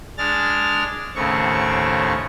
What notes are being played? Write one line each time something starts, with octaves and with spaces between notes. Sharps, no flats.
G#3 D4 F6 A6
D#2 A2 C#3 C4 C#6